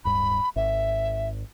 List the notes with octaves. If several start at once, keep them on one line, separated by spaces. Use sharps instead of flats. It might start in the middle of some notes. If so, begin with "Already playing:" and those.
D1 G2 B5
G#1 E5